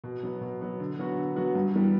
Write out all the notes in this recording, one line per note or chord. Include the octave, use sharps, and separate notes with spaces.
B2
F#3 B3
B2
F#3 B3
D3
F#3 B3 F#4
D3
F#3 B3 F#4
G2
E3 G3 B3